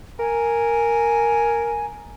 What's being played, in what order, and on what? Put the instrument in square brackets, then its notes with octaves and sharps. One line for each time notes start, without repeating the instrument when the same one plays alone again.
[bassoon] A#4 [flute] G#5